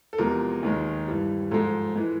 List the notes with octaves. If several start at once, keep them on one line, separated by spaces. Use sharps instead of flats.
A4
E2 C3 F3 G#3 A#4
D#2 D#3 G#3
G2 E3 G3
G#2 F3 G#3 A4
E3 G#3